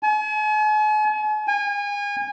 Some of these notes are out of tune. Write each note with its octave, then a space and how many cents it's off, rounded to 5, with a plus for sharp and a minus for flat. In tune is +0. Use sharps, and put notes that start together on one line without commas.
G#5 +45
G#5 -30